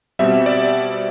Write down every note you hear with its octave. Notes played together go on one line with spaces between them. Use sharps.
B2 G3 C4 E5
D5